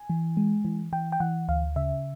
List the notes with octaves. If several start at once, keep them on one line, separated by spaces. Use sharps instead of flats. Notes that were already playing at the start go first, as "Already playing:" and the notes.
Already playing: G#5
E3
G#3
E3
E3 G5
G5
E3 F#5
D2 F5
C#3 E5